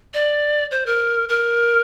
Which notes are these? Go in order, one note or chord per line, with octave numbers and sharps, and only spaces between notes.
D5
C5
A#4
A#4